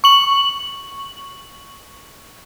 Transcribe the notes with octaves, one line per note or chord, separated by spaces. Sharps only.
C#6 F#7